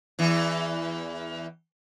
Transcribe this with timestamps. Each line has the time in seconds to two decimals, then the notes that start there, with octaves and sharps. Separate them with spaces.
0.19 E2 E3